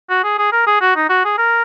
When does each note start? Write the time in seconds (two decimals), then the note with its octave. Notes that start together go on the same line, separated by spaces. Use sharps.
0.10 F#4
0.24 G#4
0.39 G#4
0.53 A#4
0.67 G#4
0.81 F#4
0.96 D#4
1.10 F#4
1.25 G#4
1.38 A#4